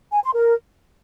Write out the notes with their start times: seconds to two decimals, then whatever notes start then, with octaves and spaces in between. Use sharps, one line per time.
0.12 G#5
0.23 C6
0.34 A#4